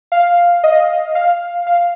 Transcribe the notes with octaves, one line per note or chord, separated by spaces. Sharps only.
F5
D#5
F5
F5